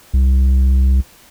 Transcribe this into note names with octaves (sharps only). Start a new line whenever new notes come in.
C2